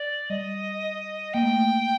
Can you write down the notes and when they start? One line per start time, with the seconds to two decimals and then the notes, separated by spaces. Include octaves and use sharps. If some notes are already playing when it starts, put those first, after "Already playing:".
Already playing: D5
0.30 G3 D#5
1.34 A#3 G5
1.43 A3